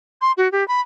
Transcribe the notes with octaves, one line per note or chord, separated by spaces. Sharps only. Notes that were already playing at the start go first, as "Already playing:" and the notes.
C6
F#4
G4
B5